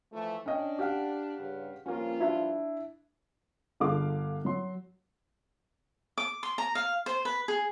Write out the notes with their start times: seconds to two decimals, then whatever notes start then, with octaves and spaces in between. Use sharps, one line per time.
0.12 E3 F3 A3
0.46 C#4 D4 D#5 G5
0.79 G4 F5 F#5
1.38 G2 C#3
1.86 G2 F3 A#3 C#4 F4
2.21 D4 E4
3.80 G1 D3 G#4 F5 D6
4.45 F#3 C6
6.18 D6
6.43 C6
6.58 A#5
6.75 F5
7.06 C5
7.25 B4
7.48 G#4